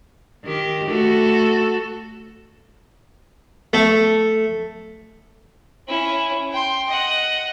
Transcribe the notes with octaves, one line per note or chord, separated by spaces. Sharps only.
D#3 G4
A3 F#4 A4
A3
C#4 E4
G5 C6
D#5 F#5